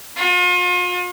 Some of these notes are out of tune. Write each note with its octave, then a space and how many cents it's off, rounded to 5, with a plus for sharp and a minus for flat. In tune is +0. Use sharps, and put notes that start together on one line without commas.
F4 +40